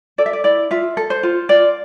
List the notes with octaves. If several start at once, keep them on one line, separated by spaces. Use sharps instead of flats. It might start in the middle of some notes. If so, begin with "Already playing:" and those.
A4 D5
E5
D5
E4 D5
F4 E5
A4
C5
F4
F4 D5